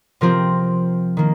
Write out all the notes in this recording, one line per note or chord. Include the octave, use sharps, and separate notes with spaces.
C3 F3 C4 F4 A#4
D#3 A#3